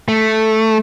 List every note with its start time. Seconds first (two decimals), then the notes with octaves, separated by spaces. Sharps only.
0.08 A3